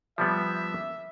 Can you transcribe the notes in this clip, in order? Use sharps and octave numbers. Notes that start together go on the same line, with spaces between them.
F3 G3 B3 E5